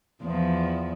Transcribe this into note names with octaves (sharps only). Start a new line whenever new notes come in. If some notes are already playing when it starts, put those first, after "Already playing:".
E2 F3